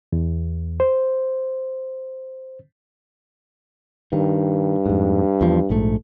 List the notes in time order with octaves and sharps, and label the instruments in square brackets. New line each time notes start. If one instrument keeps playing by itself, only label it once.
[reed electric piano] E2
C5
[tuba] G2 [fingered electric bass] D#3
[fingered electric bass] F2 G#2
E2 F3
A#1 G#2 A3